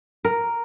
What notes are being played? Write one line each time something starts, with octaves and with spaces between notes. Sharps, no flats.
A#4